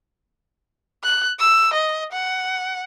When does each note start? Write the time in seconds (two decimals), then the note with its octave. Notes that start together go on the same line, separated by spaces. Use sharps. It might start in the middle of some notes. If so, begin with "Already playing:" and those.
1.04 F#6
1.39 E6
1.74 D#5
2.12 F#5